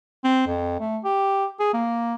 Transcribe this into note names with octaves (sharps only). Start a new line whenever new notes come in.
C4
F2
A3
G4
G#4
A#3